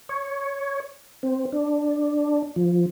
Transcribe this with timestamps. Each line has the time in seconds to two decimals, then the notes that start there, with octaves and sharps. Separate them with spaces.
0.09 C#5
1.23 C4
1.52 D4
2.56 F3